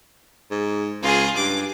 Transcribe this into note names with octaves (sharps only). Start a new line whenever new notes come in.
G#2
C#2 F4 G#4
G2 D6